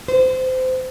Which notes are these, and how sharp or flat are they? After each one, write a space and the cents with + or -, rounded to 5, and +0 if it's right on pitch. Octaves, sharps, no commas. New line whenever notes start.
C5 -25